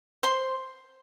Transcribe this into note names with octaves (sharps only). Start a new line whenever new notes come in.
C5 C6